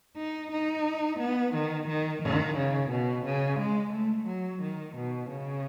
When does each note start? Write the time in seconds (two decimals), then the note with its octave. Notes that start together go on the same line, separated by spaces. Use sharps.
0.17 D#4
0.51 D#4
1.19 B3
1.54 D#3
1.88 D#3
2.22 D#3
2.57 C#3
2.90 B2
3.25 C#3
3.59 G#3
3.93 A3
4.27 F#3
4.61 D#3
4.96 B2
5.29 C#3